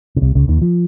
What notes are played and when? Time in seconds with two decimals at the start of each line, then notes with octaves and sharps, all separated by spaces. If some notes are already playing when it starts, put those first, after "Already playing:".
0.16 C#3
0.22 C2 C3
0.35 C#2 C#3
0.48 D#2 D#3
0.62 F3